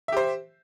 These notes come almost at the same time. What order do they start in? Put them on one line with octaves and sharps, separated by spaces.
E5 G4 C5